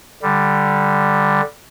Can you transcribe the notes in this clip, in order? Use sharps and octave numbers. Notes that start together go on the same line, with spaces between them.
D3 G3